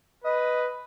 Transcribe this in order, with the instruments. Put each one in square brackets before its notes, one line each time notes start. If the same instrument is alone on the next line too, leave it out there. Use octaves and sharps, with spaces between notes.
[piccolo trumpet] B4 [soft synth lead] D#5